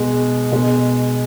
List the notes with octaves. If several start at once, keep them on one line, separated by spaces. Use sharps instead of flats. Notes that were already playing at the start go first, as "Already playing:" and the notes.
Already playing: B2 G#3
B2 G#3